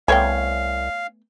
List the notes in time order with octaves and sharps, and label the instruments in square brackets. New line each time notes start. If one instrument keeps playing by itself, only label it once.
[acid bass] C2 [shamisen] A3 B3 G5 [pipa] C#5 G#5 [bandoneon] F5